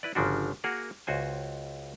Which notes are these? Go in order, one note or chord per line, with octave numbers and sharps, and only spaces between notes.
E4 B4 D5
G1 C#3 F3 D4 F#4
A#3 F#4 G#4 A#4 F#5
C#2 F#4 C5 G#5